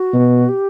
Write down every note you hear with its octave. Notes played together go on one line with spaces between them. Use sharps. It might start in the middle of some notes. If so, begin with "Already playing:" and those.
Already playing: F#4
B2
G4